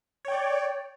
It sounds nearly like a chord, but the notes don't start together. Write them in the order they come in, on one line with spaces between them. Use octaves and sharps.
C#5 G5 D5